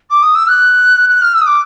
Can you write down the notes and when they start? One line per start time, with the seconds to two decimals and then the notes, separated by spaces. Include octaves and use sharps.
0.10 D6
0.22 D#6
0.35 E6
0.47 F#6
1.09 F#6
1.21 F6
1.34 E6
1.41 D#6
1.46 D6